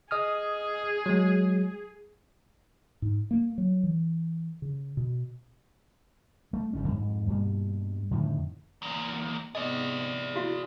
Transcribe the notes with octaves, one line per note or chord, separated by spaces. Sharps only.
G#4 D#5 D#6 F6
F#3 G#3
G#2
A#3
F#3
E3
C#3
B2
A3
G1 F#2 C#4
F2 G#2
G2 B2 A#3
F2 A2 D3 D#3
E2 A#3
G#2 C3 B3 G#4 D5 D#5
E4 F#4 F5